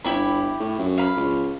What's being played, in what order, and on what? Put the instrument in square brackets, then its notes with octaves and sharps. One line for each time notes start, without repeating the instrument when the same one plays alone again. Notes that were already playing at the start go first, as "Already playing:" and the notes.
[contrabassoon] G1 [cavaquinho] E4 G4 B5
[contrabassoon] A2
F#2
[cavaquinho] F5 B5
[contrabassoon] C#2